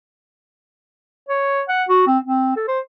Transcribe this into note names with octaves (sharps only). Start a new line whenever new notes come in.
C#5
F#5
F#4
C4
C4
A4
C5